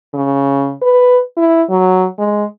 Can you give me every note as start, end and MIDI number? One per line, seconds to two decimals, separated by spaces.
0.14 0.73 49
0.82 1.19 71
1.37 1.63 64
1.70 2.07 54
2.19 2.44 56